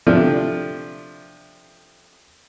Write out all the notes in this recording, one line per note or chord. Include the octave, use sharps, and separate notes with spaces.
C3 F3 A3 D4